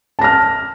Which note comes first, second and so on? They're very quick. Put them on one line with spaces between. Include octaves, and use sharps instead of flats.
A5 A#6 F6